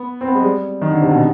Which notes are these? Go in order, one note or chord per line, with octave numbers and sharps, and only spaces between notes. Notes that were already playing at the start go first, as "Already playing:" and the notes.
Already playing: B3
C4
B3
G#3
G3
D#3
D3
C3
B2